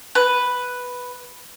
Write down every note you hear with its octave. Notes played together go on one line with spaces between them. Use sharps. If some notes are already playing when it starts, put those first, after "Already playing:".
B4